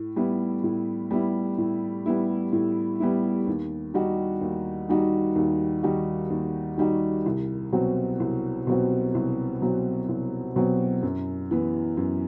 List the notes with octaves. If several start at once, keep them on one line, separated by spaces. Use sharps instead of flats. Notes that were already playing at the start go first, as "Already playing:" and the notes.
Already playing: A2
G3 B3 E4
A2
G3 B3 E4
A2
G3 B3 E4
A2
G3 B3 E4
D#2
D#3 G3 D#4 F#4
D#2
D#3 G3 D#4 F#4
D#2
D#3 G3 D#4 F#4
D#2
D#3 G3 D#4 F#4
C2
B2 F#3 C4 F#4
C2
B2 F#3 C4 F#4
C2
B2 F#3 C4 F#4
C2
B2 F#3 C4 F#4
F#2
E3 B3
F#2